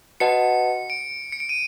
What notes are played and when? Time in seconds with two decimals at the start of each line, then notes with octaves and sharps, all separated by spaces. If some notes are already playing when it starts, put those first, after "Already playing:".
0.20 F#4 B4 D#5 F#5 A5 C#7
0.90 D7
1.32 C#7
1.40 D7
1.49 D#7